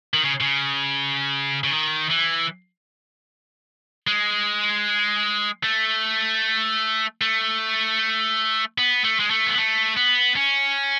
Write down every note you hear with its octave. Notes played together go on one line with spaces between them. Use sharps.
D#3
C#3
C#3
C#3
D#3
E3
G#3
A3
A3
B3
A3
G#3
A3
B3
A3
B3
C#4